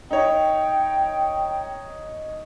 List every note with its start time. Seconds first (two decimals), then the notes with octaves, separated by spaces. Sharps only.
0.11 D#4 C#5 G5